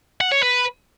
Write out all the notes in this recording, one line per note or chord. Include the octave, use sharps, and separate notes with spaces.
F#5
C#5
B4